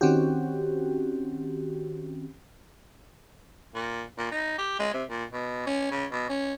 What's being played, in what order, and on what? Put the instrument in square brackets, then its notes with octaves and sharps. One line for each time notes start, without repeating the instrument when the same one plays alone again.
[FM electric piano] D#3 C4 C#4 F#4 G4
[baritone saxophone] A#2
A#2
D#4
G4
G#3
C3
A#2
B2
C#4
C#3
B2
C#4